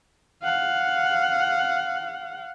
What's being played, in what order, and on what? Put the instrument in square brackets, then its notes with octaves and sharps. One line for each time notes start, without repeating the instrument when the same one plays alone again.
[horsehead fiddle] F5 F#5